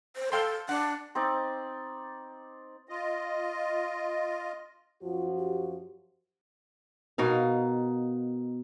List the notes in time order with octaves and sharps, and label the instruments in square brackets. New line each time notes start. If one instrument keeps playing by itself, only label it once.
[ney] C5
[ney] A4 [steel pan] F5 G5 C6
[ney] D4 [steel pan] F#5
[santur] C4 D#4 D5
[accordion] F4 D#5
[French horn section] F#2 F3 F#4 [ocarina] F4
[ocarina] G4
[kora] B2 D#4 A#4 F5